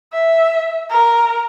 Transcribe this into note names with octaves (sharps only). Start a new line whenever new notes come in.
E5
A#4